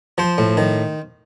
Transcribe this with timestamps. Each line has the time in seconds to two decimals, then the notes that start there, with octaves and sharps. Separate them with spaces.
0.18 F3 C5
0.38 A2
0.57 D#3